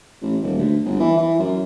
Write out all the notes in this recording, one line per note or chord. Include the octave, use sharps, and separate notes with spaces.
A1
D#1
D2
G1
E3
E3
F#2